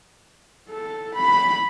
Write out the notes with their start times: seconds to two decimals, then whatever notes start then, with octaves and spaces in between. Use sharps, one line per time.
0.70 A4
1.15 B5